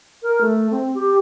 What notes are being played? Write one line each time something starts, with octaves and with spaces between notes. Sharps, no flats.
A#4
A3
C4
G4